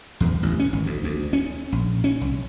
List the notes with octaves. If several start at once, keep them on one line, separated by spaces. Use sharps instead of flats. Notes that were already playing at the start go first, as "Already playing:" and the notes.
E2
A1
C#4
G#1
D2
D2
C#4
A#1
C#4
C2